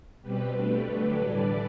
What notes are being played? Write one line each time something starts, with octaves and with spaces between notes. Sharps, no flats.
B2 G3 C4 G4 B4
B2 A3 D4
D3 F#3 A3 D4
A2 E3 G3 D4 B4 D5